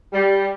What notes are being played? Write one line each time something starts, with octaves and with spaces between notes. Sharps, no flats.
G3